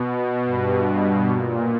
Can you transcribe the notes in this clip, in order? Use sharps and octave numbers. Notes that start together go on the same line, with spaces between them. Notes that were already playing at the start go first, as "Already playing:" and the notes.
Already playing: B2
G2
A#2